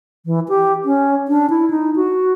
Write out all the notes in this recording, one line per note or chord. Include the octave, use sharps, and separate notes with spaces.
E3
G4
C#4
D4
E4
D#4
F#4